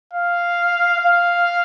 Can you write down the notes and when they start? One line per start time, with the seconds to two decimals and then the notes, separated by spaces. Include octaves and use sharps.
0.13 F5
1.01 F5